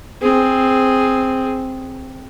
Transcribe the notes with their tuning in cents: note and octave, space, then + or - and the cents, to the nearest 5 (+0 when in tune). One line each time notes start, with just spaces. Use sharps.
C4 +0 G#4 +0